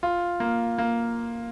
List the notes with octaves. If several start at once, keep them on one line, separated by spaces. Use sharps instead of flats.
F4
A#3
A#3